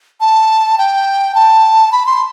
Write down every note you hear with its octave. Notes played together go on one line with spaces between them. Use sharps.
A5
G5
A5
B5
C6